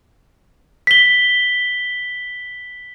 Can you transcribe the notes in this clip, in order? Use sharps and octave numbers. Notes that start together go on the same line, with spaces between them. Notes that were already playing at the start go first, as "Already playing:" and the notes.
B6 G7